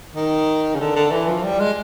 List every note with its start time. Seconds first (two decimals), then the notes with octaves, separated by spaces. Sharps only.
0.15 D#3
0.75 C#3
0.80 D3
0.96 D3
1.11 E3
1.28 F3
1.43 G3
1.59 G#3